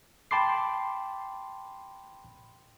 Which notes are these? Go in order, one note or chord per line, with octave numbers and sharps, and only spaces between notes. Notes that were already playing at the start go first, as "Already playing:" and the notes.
G5 A5 B5 C6 D6 C7